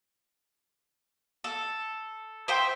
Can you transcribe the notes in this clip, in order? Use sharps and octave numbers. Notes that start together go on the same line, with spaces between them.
A4
C5 E5 G5